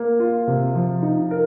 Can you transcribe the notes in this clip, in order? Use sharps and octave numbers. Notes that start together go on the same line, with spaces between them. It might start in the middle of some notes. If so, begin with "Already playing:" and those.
Already playing: A#3
F4
C3
F3
D#4
A#4